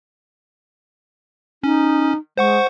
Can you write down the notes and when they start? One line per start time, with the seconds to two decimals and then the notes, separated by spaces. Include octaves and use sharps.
1.64 C#4 D#4
2.37 G#3 C5 F#5 C#6